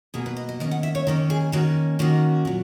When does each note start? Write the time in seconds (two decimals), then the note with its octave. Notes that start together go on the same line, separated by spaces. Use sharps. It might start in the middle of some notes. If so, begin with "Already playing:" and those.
0.14 B2 F#3 A#3 G#4
0.26 B4
0.37 D#5
0.49 D#5
0.60 D#3 A#3 C#4 D#5
0.71 F#5
0.83 E5
0.95 C#5
1.07 D#3 A#3 C#4 A#4
1.30 G#4
1.52 D#3 A#3 C#4 F#4
1.99 D#3 A#3 C#4 F#4
2.45 A#2 F#3